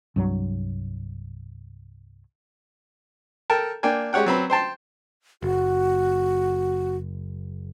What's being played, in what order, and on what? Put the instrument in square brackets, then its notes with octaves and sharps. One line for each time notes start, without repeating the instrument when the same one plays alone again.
[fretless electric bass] C2 G2 F#3
[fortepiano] A4 A#4 G5 A5
A#3 D4 G5 G#5
G#3 G4 C#5 F#5 G5
F#3 C4 B4
C5 G5 A5 C6
[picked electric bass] F#1 [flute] F#4